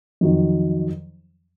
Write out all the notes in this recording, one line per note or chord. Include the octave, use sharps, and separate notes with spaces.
F2 D#3 F#3